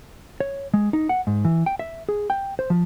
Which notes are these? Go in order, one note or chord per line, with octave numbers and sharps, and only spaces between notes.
C#5
G#3
D#4
F#5
G#2
E3
G5
E5
G#4
G5
C5
F3